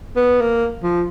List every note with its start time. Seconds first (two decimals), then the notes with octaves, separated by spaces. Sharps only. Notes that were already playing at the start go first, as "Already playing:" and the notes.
0.16 B3
0.41 A#3
0.83 F3